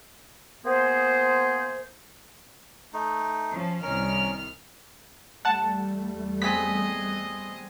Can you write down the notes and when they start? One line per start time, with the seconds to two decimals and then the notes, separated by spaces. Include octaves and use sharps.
0.66 A#3 B3 G#4 C5
2.94 A3 D#4
3.52 F3 C#4 A5
3.82 C2 D#3 C#4 A#4 F6
5.45 E2 G3 A3 F#5 A5
6.42 B3 C4 G#4 D#5 B6